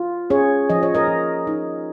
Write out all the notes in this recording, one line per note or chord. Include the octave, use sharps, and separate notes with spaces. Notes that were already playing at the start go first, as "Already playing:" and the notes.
Already playing: F4
C#4 G#4 C#5
F3 D#5
C#5
A#4 D#5
F3
D#4